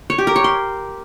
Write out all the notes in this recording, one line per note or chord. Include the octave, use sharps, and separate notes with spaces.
C#5
G4
A#4
C#5
C6